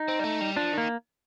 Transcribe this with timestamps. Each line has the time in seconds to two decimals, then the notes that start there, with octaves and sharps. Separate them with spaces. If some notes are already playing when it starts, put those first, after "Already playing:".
Already playing: D#4
0.08 C4
0.20 G3
0.24 A3
0.41 G3
0.56 F3 D4
0.73 D#3 A#3